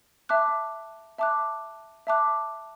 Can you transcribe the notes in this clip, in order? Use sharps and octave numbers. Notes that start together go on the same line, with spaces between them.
E5 A5 D6 F#6
E5 A5 D6 F#6
E5 A5 D6 F#6